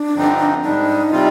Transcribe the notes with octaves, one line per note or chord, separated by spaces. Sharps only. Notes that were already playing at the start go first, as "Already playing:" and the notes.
Already playing: D4
G2 D3 F3 C4 D#4
G#2 G3 D4 D#4
C3 G3 C4 F4